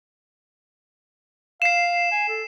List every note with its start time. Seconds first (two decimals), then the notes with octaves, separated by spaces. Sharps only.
1.62 F5 C7 E7
2.12 G#5
2.28 A4